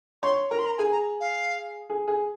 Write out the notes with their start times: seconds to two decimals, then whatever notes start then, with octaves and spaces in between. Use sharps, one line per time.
0.23 C#5 C6
0.50 A#4 A#5
0.59 C6
0.66 A#5
0.78 G#4 G#5
0.92 A#5
1.20 F5
1.90 G#4
2.08 G#4